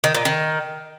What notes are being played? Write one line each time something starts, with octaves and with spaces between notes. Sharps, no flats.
D#3
A#2
D#3